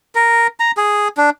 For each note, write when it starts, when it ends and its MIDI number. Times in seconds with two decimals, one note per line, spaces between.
0.15 0.47 70
0.60 0.71 82
0.77 1.08 68
1.17 1.30 62